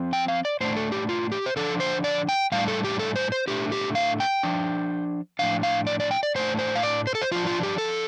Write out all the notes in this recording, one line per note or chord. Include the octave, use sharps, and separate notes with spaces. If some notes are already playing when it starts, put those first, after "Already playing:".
Already playing: F3 C4
G5
F5
D5
A2 A3 D4 C5
A4
G4
F4
G4
C5
D3 F3 D4 A4
C5
D5
G5
A2 G3 D4 F5
A4
G4
A4
C5
C5
A2 A3 D4 G4
G4
F5
G5
F3 D4
A2 F3 D4 F5
F5
D5
D5
G5
D5
A2 A3 D4 C5
C5
F5
D5
C5
A4
C5
F3 D4 F4
F4
G4
A4